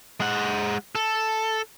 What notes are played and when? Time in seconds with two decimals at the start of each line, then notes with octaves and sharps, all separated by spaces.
0.20 G#3 F#5
0.95 A4